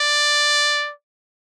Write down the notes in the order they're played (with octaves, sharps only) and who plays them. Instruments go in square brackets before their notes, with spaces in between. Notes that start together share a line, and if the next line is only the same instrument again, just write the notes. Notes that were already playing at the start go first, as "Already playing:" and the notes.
Already playing: [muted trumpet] D5